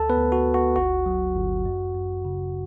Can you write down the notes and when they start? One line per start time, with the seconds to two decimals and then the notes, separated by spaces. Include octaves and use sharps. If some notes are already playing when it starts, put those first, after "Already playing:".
Already playing: D2 A4 A5
0.10 B3 B4
0.17 D2
0.32 F#4
0.47 D2
0.54 F#4
0.76 G1 F#4
1.06 F#3
1.35 G1
1.65 F#2
1.95 F#2
2.25 C#3